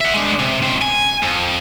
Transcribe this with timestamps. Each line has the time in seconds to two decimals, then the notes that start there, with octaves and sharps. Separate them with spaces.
0.01 E5 F#5
0.14 G#3 D4
0.39 C3
0.62 C#2 C4
0.81 G#5
1.23 F2